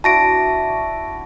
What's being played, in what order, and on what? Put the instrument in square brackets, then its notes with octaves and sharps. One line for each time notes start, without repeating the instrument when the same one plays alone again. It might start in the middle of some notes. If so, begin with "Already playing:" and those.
[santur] D4 E4 F#4 [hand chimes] A5 A#6 D7